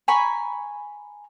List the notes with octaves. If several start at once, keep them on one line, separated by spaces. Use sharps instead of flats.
G#5 A#5 B5 C#6